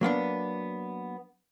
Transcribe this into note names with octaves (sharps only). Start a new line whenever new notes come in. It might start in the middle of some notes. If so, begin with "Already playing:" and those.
F#3 A#3 B3 D4